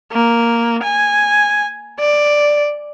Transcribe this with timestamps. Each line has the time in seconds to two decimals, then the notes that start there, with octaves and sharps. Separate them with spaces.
0.12 A#3
0.83 G#5
2.00 D5